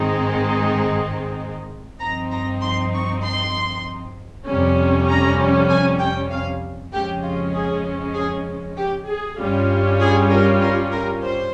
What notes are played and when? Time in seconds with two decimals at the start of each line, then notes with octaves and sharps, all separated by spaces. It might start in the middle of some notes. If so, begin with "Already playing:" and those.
Already playing: G#2 D#3 G#3 C4 D#4
2.00 G2 F3 C4 D#4 A#5
2.31 A#5
2.61 C6
2.93 C#6
3.23 C6
4.46 F2 C3 G3 C#4
5.08 A#5
5.69 G#5
5.99 G5
6.31 F5
6.92 F2 C#3 F3 G#3 C#4 G4
7.23 F4
7.53 G#4
8.15 G#4
8.77 G4
9.07 G#4
9.39 G2 G3 C#4 F4
10.00 G#4
10.30 A#4
10.61 A#4
10.92 A#4
11.22 C5